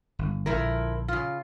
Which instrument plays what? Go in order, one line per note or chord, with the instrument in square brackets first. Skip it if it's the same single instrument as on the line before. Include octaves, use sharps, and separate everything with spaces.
[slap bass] G1
[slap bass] A#1 D3 [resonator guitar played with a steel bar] F3 E4 A#4
[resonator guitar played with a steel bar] C#3 F4